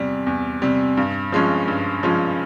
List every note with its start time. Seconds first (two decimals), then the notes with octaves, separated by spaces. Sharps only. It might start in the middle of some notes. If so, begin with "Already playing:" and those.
Already playing: E2 C3 G3
0.27 E2
0.62 C3 G3
0.97 G2
1.32 F3 G#3 C#4
1.68 G2
2.03 F3 G#3 C#4